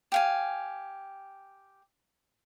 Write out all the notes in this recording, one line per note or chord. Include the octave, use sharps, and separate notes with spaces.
G4 F5 G#5